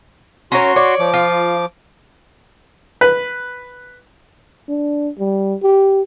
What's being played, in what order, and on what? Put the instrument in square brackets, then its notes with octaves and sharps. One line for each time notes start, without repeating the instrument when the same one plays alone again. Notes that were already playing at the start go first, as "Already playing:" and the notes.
[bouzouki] C#4 A#4 C#5 [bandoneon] F#4 C6
[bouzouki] C#5 D5
[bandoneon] F3 D6
[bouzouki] F4
[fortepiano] B4
[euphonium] D4
G3
G4